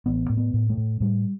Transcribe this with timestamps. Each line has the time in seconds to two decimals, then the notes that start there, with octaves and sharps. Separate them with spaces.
0.06 A1 B3
0.30 A2
0.37 B3
0.54 A2
0.70 A3
0.77 A2
1.00 A2 G3